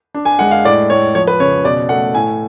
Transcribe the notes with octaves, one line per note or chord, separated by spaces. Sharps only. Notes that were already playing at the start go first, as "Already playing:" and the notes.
D4
G#5
G#3 F#5
F5
A2 D5
A2 C#5
F3 C#5
B4
C#3 C#5
B2 D5
A3 F#5
A2 G#5